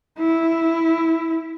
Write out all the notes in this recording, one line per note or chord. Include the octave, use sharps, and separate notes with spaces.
E4